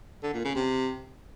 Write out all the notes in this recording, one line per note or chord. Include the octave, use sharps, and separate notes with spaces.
D3
A#2
C#3
C3